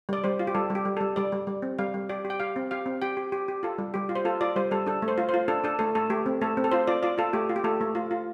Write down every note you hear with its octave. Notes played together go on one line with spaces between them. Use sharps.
G3 D5
G3 C5
F4
G4
G3 A4
G3
G4
G3
A4
G3
G3 D5
G3
G3
C4
G3 F5
G3
G4 D5
G4
G5
G4 F5
C4
G4 F5
C4
G4 G5
G4
G4
G4
F4 A4
G3
G3 G4
F4
C5
F4 A4
F4 D5
G3 C5
G3 A4
D4 A4
A3
C5
F4
C5
F4
D4 A4
D4 A4
A3 A4
A3 A4
A3 G4
C4
A3 A4
C4
A4
F4 C5
F4 D5
F4 D5
F4 A4
A3 G4
F4
G4
A3 A4
A3
F4
F4